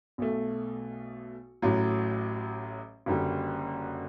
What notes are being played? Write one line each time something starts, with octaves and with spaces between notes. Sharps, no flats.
B1 B2 A3
A1 A2 F#3
F#1 F#2 D3 G3